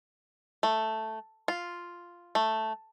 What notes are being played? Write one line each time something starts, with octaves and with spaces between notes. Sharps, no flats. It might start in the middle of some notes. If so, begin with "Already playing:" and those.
A3
F4
A3